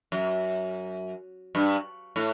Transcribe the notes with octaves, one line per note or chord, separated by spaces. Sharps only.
F#2
G2
A2